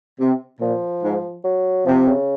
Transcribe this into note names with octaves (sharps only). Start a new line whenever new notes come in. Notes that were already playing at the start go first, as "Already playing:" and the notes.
C3
A#2 F3
G#2
F#3
C3 F3
C#3